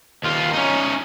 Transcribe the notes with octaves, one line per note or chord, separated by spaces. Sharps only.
D#2 F4
C#4 D#4